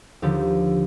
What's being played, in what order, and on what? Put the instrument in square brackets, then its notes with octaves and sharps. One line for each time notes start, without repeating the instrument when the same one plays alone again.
[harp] D#2 D3 F3 G4